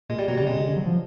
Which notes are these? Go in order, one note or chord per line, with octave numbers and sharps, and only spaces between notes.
A#2 G#3
G3
B2 F#3
G3
C#3
C3 G#3
C#3
D3
F#3
F3